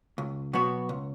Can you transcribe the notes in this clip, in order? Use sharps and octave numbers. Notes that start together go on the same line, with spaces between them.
C#2
B2 F#3 B3 F#4
C#2